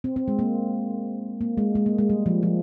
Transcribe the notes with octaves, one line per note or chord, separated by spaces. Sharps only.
C4
C4
G#3
A#3
A#3
G#3
G#3
A#3
G#3
G3
F3
F3